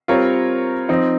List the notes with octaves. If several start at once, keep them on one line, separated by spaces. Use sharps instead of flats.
G3 C4 F4 A#4 C#5
F3 C4 D#4